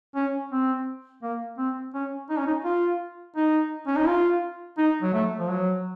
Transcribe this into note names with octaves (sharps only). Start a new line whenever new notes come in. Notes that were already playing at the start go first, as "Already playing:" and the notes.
C#4
C4
A#3
C4
C#4
D#4
C#4
D#4
F4
D#4
C#4
D#4
F4
D#4
F#3
A3
F3
F#3